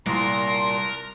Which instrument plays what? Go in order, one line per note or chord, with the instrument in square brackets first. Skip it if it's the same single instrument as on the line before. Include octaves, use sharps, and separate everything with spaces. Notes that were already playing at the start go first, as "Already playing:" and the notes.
[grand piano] C2 [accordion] A#2 [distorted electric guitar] A#4 [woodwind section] A5 A#5 C6